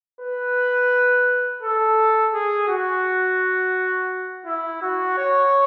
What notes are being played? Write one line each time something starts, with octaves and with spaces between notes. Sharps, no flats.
B4
A4
G#4
F#4
E4
F#4
C#5